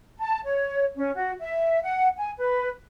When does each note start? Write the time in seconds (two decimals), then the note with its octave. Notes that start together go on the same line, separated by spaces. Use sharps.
0.18 A5
0.44 C#5
0.96 C#4
1.15 F#4
1.39 E5
1.82 F#5
2.17 G#5
2.37 B4